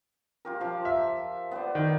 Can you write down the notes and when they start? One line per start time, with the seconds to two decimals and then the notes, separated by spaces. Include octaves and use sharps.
0.45 F4 G4 A#4
0.60 F3 F5
0.85 E5
1.51 B3 C5 D5
1.75 D#3